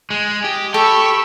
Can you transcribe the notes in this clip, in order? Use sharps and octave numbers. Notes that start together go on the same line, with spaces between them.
G#3
G4 D#5
G4 A4 B5 C#6 E6